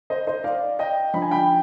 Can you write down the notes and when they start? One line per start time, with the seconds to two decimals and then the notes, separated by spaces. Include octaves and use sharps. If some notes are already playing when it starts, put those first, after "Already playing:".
0.10 C5 D#5
0.27 C5 D#5
0.44 D5 F5
0.79 D#5 G5
1.14 D3 F3 B5
1.22 G#5
1.31 G5 B5